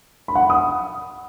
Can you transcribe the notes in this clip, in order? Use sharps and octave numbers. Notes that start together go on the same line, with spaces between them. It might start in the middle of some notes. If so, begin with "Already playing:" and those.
B5
F#5
B5
D#6